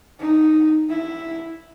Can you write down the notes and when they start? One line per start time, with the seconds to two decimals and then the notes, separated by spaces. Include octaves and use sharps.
0.20 D#4
0.89 E4